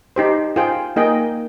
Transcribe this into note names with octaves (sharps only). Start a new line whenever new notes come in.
D#4 G4 C5
F4 G#4 C5 G5
A#3 D#4 G#4 D#5 G5